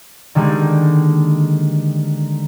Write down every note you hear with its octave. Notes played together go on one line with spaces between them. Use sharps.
D3 D#3 G3 G#3 A#3